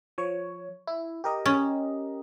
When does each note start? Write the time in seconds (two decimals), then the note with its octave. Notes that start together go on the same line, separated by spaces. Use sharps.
0.18 F3 C#5
0.87 E4
1.24 G4 A#4 D#5
1.46 C#4